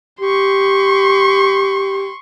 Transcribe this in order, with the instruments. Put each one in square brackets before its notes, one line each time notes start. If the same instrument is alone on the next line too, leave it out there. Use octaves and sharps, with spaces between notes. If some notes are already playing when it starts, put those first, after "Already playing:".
[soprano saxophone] G4 [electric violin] C6 C#6